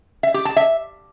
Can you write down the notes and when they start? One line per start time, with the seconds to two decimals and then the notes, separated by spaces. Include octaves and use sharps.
0.23 E5
0.34 G4
0.45 A5
0.56 E5